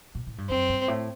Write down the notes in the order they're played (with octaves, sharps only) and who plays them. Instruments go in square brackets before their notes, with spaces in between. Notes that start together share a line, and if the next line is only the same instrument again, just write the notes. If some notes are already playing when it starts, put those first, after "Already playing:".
[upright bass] A#2
A2
G2
[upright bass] F#2 [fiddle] C4
[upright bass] G2
A2